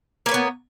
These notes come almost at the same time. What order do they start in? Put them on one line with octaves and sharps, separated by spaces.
A#3 B4 C#5 B3